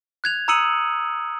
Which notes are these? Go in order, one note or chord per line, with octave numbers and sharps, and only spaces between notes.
F#6 G#6 F7
A#5 D#6 E6 C#7 D#7 F#7